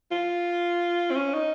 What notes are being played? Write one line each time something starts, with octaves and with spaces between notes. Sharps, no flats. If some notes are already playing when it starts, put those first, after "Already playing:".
F4
C4
C#4
D#4